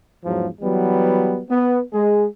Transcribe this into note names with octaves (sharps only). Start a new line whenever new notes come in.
E2 G#2 F3 F#3
E3 F#3 G3 B3
B3
G#3 G#4